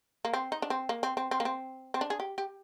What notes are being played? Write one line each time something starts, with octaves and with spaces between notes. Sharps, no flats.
A#3
C4
D#4
D4
C4
A#3
C4
C4
C4
A#3
C4
C4
D4
G#4
G4
G4